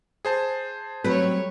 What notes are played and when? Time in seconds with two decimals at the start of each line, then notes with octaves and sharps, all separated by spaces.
0.25 G#4 C5 A5
1.04 F#3 G3 A3 C4 B4 C#5